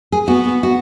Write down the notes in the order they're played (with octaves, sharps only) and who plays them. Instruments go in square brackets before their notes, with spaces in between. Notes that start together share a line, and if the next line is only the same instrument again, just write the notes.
[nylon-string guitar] G#4
[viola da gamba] B3 [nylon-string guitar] F#4
[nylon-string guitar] F#4